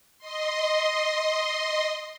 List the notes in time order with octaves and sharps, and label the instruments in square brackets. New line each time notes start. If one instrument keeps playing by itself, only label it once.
[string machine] D#5 C6